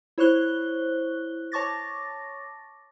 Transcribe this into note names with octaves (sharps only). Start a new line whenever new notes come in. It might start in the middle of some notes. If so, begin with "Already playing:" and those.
E4 C5 C#5 C#6 F#6 G7
C#5 A5 C#6 D6 A6 A#6